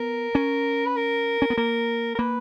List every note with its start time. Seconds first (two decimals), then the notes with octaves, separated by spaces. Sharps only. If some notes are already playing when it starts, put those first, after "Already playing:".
Already playing: B3 A#4
0.35 C#4
0.86 B4
0.96 A#4
1.42 C#4
1.50 B3
1.57 A#3 A#4
2.15 A#4
2.19 A#3 B4